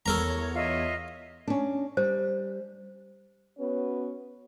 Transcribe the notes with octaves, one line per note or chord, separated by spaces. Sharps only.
E2 A4 A#4 C#5 A#5
F4 D#5 E5
C#4 D4
G3 C5
B3 C#4 F#4 B4 C#5